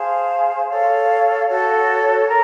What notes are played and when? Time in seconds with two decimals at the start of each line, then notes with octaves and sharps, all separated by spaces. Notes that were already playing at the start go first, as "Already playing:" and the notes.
Already playing: G#4 C5 F5 A5
0.69 A4 C#5 F5
1.48 F#4 A4 C#5
2.28 A#4